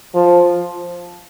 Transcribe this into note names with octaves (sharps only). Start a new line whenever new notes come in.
F3